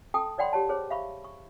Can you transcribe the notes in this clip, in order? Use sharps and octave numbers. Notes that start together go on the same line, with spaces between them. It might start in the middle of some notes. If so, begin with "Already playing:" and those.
A4 G5 A5 D#6
C#5 D5 F#5 G5 B5 C6
G4 C#5 A5
G#4 C5 C#5
E5 F5 B5 C#6
C#6